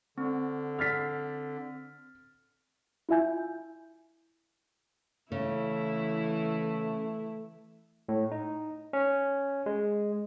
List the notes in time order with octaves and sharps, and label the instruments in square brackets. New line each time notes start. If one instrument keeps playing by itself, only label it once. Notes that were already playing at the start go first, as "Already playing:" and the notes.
[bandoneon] D3 [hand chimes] C4
[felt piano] F6 A6 B6
[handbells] E4 F4 E5 G#5 G6
[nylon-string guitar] C#3 [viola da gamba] E3 E4 [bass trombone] A3
[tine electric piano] A2
D#4
C#4
G#3